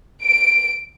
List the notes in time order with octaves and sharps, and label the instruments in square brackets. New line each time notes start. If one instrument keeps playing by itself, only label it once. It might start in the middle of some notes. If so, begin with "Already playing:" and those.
[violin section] D7